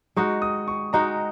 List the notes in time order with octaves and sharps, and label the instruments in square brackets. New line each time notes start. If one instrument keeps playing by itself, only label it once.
[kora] G#3 D#4 F#4 [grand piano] C#6
[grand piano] D#6
C#6
[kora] G#3 D#4 F#4 [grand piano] A#5